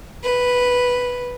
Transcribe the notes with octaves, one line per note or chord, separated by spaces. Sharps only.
B4